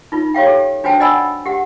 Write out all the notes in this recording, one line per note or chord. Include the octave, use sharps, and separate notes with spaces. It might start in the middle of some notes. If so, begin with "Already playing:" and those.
D#4 F4
G4 C#5 F5 G5
G4 A4
D4 F#4 C5 G5 A5
D5 D#5 F#5 G#5 B5 E6
G4 F#5